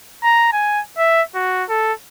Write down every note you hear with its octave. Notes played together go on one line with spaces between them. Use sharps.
A#5
G#5
E5
F#4
A4